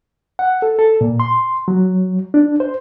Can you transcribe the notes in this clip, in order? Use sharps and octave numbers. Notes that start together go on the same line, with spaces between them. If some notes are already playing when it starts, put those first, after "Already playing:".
F#5
A4
A4
A#2
C6
F#3
D4
C5